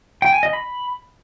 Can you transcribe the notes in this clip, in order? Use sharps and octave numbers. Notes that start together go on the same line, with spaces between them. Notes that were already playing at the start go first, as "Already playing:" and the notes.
G5
G#5
D#5
B5